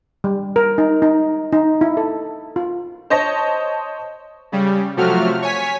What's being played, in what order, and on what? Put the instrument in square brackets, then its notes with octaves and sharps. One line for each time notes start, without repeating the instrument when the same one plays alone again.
[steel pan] G3
A#4
D#4
D#4
D#4
E4
A4
F4
[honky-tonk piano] C5 C#5 D#5 A5 A#6
[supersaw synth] C#3 G3
C3 F3 F#3 A3 F#4 F6
C#5 G#5 B6